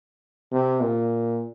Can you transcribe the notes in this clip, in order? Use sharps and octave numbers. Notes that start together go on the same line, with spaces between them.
C3
A#2